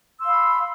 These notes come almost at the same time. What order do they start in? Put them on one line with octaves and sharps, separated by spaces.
E6 C6 F5 B5